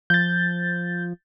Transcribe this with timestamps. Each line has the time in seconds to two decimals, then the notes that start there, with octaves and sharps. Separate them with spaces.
0.10 F3 G6 A6